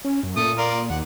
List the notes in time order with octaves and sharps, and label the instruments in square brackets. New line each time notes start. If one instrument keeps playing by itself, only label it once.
[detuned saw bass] C#4
F#2
[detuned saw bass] A#2 [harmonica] A3 D#6
[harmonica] F4 A#4 D5
[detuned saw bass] D#2 [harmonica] F#5